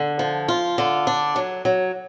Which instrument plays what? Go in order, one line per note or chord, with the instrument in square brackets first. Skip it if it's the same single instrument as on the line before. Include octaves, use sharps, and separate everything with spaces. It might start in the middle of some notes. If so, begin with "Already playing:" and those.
Already playing: [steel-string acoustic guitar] D3
F3
F4
D3
D4
F#3
F#3